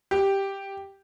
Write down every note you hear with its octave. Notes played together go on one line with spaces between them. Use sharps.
G4